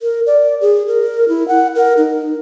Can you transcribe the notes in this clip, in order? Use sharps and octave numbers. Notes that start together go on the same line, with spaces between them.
A#4
D5
G#4
A#4
E4
F#5
A#4
D#4